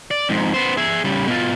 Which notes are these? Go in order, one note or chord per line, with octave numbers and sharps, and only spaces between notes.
D5
F2 G#2
B3 C5
G#4 E5
C#3 G3
B2 F4